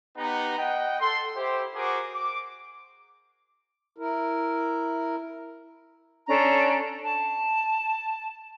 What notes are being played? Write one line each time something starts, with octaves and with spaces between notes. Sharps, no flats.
B3 D#4 G4 B4 F#5 A#5
D#5 F#5 G5
A4 C6
E4 G4 C5
F#4 G#4 A#4 C5 D6
D6
E4 A#4
C#4 D4 A4 A#5
A5